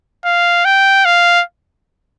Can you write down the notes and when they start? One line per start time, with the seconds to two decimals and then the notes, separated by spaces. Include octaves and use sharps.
0.25 F5
0.65 G5
1.05 F5